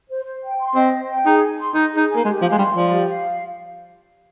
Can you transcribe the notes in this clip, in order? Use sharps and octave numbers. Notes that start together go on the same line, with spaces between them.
C5
C5
G5
C6
C4 D#5
C5
G5
D#4 G#4
G#5
C6
D#4 D#5
D#4 G#4
G#5
A#3
G#3 G4
F3 F5
G#3
G3 C6
F3 D5
G4
F5